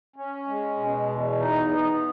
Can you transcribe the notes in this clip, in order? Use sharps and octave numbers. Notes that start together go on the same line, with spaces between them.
C#4
G#3
B2
E2
D#4
B3